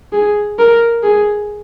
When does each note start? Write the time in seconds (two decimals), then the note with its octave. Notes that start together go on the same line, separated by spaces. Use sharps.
0.13 G#4
0.59 A#4
1.03 G#4